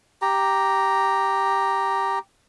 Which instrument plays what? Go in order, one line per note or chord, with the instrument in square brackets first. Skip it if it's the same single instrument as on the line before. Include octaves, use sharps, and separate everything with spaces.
[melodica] G4 A#5